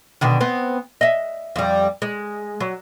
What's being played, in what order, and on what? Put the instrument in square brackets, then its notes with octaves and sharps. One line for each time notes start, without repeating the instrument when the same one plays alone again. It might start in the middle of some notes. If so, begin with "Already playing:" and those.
[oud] B2 D3 D#3
B3 C4
D#5 E5
F2 G3
G#3
F#3